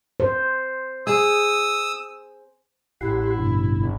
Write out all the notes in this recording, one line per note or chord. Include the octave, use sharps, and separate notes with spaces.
C5
G#4 D#6 E6
A1 E4 G4 F#5 C6
G2 B2 D3
G#1